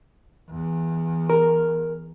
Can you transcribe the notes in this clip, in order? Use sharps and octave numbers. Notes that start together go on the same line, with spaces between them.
E2
A#4